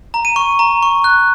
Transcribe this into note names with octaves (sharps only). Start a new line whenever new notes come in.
A#5
D#7
C#6
A#5
C#6
F#6